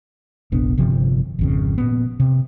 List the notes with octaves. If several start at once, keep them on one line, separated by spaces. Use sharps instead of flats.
F1 A#1 B3 D4
G1 C3 F3
G#1 F2 C#3
A#2 B3
C3